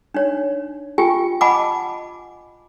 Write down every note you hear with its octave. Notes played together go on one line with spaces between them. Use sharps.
D4 D#4 C#5
F4 G4 G5 G#5
D#5 F#5 G#5 A5 B5 D6